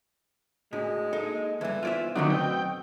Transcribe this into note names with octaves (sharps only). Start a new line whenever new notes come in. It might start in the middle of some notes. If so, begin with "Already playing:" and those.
A2 G#3 D4 F#4 G#4
A#3 D#4 A4 D#5
D2 G2 E3 G#6
B3 D#4 F4 C5 D5 E5
F#2 D3 D#3 F#3 A3 C4
B2 G5 D#6 E6